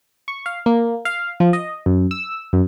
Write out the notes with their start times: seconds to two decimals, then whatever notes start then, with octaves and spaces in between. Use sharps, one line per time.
0.28 C#6
0.46 F5
0.66 A#3
1.05 F5
1.40 F3
1.53 D#5
1.86 F#2
2.11 E6
2.53 F#2